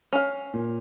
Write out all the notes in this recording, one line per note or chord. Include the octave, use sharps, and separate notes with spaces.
C#4 F5
A#2